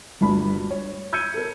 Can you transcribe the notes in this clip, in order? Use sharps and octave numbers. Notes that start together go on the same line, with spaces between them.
G1 D2 G2 B5
C#5
E6 G6 G#6 C#7 D#7
A4 A#4